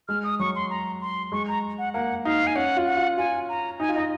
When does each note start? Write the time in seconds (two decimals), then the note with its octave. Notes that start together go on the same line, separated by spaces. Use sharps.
0.08 G#3 F6
0.24 D#6
0.40 F#3 C#6
0.56 C6
0.70 A#5
1.01 C6
1.32 G#3 C#6
1.48 A#5
1.78 F#5
1.94 A#3 F#5
2.24 D#4 F5
2.47 G#5
2.56 C#4 F#5
2.77 F4
2.87 F#5
2.97 F4
3.18 F4 G#5
3.49 A#5
3.80 D#4 G#5
3.89 F4
3.95 D#4 D#5